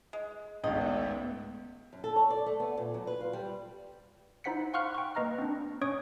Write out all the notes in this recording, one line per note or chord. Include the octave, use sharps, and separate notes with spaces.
G#3
G#1 C#2 A3 B3 D#5 E5
F#2
A4
C#5
D5
A3
B3
A#2
F#3
B4
F4
G3
D#4 E4 C5 F#5 B6 C#7
F5 F#5 C6 C#6 F6 F#6
G5 C#6
A#3 B4 D#5 A#5 F6
C4 D4
C#4 C#5 C#6 D#6 D7